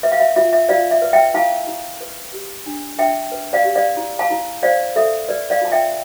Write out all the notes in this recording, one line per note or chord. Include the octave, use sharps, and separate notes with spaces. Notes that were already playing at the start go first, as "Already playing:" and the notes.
B4 E5
F5
E5
F4 E5
E5
F4 D5 F5
E5
B4
E5 G5
E4 F5 A5
E4
B4
G4
D4
D4 E5 G5
B4
D5 F5
G4
D5 F5
E4
F5 A5
E4
C5 D5 F5
A4 E5
B4 D5
D5 F5
F4 A5
E5 G5